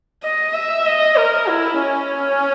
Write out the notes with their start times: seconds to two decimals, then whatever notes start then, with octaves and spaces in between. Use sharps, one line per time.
0.23 D#5
0.55 E5
0.86 D#5
1.18 A#4
1.49 E4
1.81 C#4